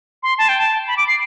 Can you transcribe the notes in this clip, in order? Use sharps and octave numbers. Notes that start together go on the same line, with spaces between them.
C6
A5
G5
A5
B5
D6
C7